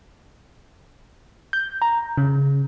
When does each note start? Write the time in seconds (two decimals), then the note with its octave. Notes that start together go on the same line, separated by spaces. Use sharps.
1.53 G6
1.82 A#5
2.18 C#3